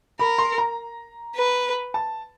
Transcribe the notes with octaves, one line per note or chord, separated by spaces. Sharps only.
A#4 B5
C6
A#5
B4
A5